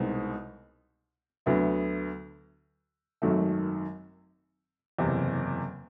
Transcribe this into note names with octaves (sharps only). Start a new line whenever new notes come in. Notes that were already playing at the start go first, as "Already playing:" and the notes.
Already playing: C2 B2 G#3 C4 D#4
D2 D3 F#3 B3 E4
G#1 F#2 D#3 F#3 A3
F#1 E2 C3